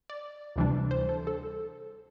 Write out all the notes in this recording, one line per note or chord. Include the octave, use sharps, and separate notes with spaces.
D5
D2 C3 E3 G3 D4
C5
A4
A4